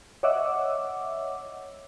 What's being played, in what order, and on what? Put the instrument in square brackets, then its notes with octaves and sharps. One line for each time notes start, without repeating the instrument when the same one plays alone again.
[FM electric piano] C#5 D#5 E5 F#5 D6 E6